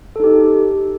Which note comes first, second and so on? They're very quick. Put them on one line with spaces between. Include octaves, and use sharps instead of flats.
A4 D#4 G4